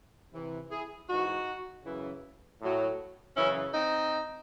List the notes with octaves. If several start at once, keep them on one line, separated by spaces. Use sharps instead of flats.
C3 E3
E4 G#4
G#2 E3 D#4 F#4
F#2 C#3 E3
A2 F#3
F#2 C#3 E3 C#4 E4
C4 D#4